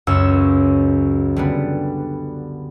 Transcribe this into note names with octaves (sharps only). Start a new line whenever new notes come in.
C#2 F#2 C#5 E6
D3 G3 B3